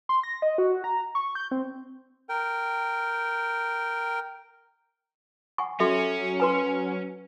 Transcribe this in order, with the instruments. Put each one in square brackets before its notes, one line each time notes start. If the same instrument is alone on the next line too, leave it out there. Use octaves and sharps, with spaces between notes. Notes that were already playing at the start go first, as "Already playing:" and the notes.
[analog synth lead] C6
A#6
D#5
F#4
A#5
C#6
G6
C4
[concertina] A#4 G5
[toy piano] F#5 G#5 C#6
[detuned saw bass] F#3 [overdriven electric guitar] C#4 [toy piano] F#4 A4 E5
[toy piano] F#4 B4 G#5